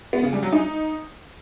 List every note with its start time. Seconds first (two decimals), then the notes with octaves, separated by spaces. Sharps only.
0.13 B3
0.23 C#3
0.33 G3
0.43 F#3
0.53 D#4